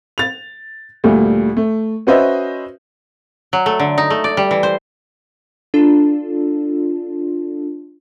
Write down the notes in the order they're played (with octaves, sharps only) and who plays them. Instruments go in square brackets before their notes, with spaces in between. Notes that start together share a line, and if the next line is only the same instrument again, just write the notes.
[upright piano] A6 F7
D2 A#2 G3 A3
A3
C#4 F#4 B4 C5 D#5 E5
[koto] F#3
A3
D3
D#4
A3
D5
G3
E3
C5
[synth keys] D4 F4 A4